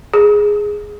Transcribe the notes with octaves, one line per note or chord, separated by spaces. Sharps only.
G#4